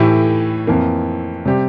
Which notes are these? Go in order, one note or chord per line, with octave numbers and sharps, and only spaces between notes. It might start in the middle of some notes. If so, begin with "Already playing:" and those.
Already playing: A2 E3 A3 E4 G4
F2 E3 A#3
C3 G3 C4 G4